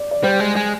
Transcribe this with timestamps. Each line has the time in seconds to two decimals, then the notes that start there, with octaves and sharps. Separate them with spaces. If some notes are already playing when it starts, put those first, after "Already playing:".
Already playing: D5
0.11 D5
0.23 G3 C5
0.40 G#3
0.56 G#3